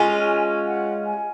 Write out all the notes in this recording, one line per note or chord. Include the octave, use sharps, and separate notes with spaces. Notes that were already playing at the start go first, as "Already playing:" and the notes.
Already playing: G#3 C#4 F4 G#5
F#5
G#5